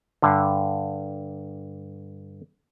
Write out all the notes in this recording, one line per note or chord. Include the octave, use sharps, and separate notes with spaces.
G2 D3